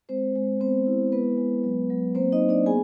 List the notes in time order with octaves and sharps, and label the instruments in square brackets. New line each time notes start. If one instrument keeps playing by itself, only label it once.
[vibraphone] G#3 C4 C5
G#3
B3 C4 C5
E4
G#3 B3 B4
G#3
F#3
F#3
A#3 C4 C5
D#4 D#5
A#3
D4 D5
B3 G#4 G#5